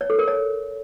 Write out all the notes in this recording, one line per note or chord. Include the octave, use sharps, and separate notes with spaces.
C#5
A4
A#4
C#5